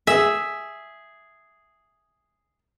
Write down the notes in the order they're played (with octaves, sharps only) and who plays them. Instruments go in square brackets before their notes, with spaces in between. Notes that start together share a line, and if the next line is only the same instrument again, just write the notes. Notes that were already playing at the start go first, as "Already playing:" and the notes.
[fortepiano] G#4 [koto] E5